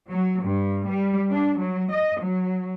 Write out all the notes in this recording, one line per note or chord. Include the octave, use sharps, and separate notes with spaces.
F#3
G2
G3
D4
F#3
D#5
F#3